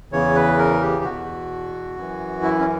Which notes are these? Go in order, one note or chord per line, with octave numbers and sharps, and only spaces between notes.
E2 C#3 E3 C#5
B4
A#4
G4
E2 B2 F#4
F#2 E3
E4
C#4